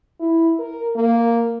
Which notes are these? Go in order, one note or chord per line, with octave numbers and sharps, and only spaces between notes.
E4
A#4
A#3